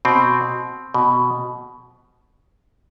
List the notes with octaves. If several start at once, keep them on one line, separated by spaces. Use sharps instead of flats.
B2 C4
B2